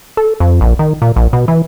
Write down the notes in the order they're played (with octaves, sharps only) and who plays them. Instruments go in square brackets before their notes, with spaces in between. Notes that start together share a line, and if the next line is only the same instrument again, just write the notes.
[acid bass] A4
F2
A#1
D#3
A#2
A#1
B2
E3